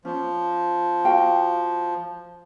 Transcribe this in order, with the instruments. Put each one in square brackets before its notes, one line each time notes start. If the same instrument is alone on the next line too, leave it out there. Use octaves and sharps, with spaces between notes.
[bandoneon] F3 [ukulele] C#4
[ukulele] F#4 F5 G5